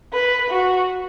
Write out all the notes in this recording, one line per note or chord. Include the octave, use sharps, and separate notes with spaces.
B4
F#4